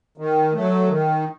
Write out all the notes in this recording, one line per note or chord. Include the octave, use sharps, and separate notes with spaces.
D#3
F#3 A3
D#3